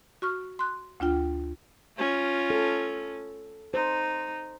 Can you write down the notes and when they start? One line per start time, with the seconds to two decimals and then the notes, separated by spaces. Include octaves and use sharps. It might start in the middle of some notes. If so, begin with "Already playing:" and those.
0.22 F#4 C#6 F6
0.59 C6 F#6
1.00 D2 D4 F4 G5
1.97 C#4 F4
2.50 A4
3.74 D#4 C5